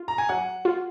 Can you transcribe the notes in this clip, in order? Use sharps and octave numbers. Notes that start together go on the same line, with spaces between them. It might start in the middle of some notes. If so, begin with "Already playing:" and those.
Already playing: F4
A#5
G#5
F#3 F#5
F4